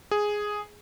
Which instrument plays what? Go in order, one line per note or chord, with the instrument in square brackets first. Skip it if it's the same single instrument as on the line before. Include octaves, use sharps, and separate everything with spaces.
[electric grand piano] G#4